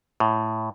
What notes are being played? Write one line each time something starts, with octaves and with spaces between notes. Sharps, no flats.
A2